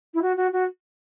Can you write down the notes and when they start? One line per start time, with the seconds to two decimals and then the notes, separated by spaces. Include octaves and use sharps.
0.14 E4
0.22 F#4
0.37 F#4
0.53 F#4